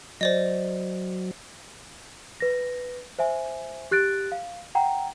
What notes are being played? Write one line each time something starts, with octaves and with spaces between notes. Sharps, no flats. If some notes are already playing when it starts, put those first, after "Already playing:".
F#3 C5 D5 D#5
B4 A#6
C5 E5 G#5
G4 F#6 A6 D7
F5
F#5 G5 A#5